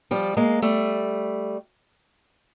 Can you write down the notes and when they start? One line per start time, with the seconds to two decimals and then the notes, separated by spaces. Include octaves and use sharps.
0.11 F3 G3
0.37 G#3 A#3
0.62 G3 A3